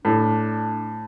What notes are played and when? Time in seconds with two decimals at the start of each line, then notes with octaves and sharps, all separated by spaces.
0.05 A2 D4